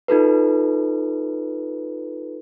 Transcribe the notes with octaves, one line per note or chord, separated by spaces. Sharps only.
D#4 F4 A4 B4